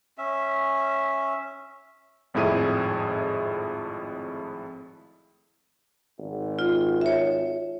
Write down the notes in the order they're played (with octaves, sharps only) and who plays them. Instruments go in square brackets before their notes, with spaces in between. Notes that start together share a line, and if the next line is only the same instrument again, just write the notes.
[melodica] C#4 E5
[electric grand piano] G#1 F2 A2 E4 G#4 D#7
[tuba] G#1
[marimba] F4
C#5 E5